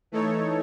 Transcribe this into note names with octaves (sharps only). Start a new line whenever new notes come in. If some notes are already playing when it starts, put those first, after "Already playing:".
E3 A3 D#4 A4 C#5